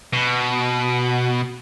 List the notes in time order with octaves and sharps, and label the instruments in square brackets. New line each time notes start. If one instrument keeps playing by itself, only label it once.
[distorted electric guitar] B2